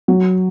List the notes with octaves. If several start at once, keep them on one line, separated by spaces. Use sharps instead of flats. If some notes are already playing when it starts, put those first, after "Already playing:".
F#3